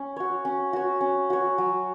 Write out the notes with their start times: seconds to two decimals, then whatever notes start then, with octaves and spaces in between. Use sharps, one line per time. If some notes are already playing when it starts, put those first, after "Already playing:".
Already playing: C#4
0.16 F#4 C#5
0.45 C#4
0.73 F#4 C#5
1.01 C#4
1.30 F#4 C#5
1.58 F#3